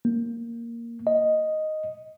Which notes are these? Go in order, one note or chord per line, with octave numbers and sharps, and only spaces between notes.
A#3
D#5